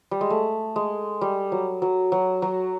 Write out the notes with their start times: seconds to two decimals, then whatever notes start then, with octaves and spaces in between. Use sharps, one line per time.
0.11 G3
0.21 G#3
0.30 A3
0.76 G#3
1.21 G3
1.52 F#3
1.82 F#3
2.12 F#3
2.42 F#3